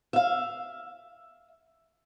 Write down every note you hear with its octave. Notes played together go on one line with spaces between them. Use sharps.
E5 F5